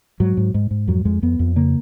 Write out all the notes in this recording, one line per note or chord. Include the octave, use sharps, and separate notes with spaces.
G#2 F#3
G#2
G#2
G#2
F2 F#3
F2 G#3
F2 B3
F2
C#3 A#3